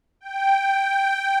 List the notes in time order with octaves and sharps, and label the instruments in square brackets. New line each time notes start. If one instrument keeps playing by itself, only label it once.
[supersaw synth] G5